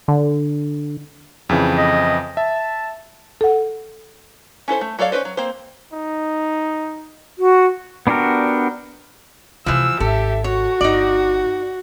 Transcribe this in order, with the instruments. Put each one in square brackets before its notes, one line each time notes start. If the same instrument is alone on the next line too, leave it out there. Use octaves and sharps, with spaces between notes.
[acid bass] D3
[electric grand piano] F2 C#3 E3
[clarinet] D#5
[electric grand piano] E5 [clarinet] A5
[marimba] A4 F#5
[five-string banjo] C#4 E4 A4 C5
A3
F#3 A4 C#5 D5 F5
C#4 F#4 B4 C5
F#3
A#3 C4 C5
[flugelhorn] D#4
[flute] F#4
[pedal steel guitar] B3 D4 F#4 G4 A#4
[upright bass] C3 A3 [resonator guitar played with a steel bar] E3 F3 [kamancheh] E6
[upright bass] G#1 [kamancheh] G4 E5 [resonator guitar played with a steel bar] A4
[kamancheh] F#4 [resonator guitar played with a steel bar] C#5
[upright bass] G1 [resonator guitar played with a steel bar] D#4 D5